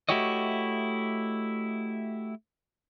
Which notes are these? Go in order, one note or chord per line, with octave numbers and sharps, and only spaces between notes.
A3 E4 F#4 G4 C#5 D#5